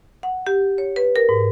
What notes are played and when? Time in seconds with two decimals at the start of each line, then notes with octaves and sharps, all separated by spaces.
0.23 F#5
0.47 G4
0.78 C#5
0.96 B4
1.16 A#4
1.29 G#2